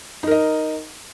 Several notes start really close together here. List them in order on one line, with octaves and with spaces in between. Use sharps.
D#4 A#4 D#5